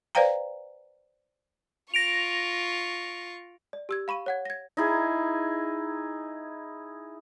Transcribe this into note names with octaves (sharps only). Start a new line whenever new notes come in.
B4 C5 D5 F5 G5 A#5
F4 C#6 A#6 D7 F7
D5
G4 E6 G#6
F5 B5 C#6 D#7
C#5 F#5 G#6
G#6 A#6
D#4 E4 G#4